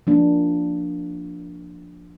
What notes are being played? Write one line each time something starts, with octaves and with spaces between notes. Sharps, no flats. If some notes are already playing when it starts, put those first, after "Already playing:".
F3 A#3 D4